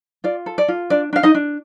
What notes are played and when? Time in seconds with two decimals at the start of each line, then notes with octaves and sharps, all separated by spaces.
0.24 F4 D5
0.46 A4
0.58 D5
0.68 F4
0.90 D4 D5
1.13 D4 F5
1.23 D#4 D#5
1.35 D4